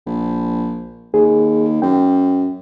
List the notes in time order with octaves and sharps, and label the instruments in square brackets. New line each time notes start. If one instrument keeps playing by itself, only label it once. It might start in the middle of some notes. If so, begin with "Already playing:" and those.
[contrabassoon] A#1
[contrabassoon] D#2 [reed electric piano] G#4
[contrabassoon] F#2 [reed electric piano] G5